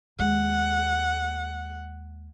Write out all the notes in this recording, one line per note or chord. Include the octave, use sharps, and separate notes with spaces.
D#2 G#3 F#5